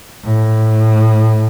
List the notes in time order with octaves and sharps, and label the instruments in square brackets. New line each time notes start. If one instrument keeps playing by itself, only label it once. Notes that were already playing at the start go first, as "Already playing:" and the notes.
[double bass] A2